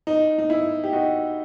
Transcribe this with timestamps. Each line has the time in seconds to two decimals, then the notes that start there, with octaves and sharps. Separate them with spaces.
0.07 D#4
0.38 D#4
0.50 E4
0.84 G4
0.93 D#4 F#4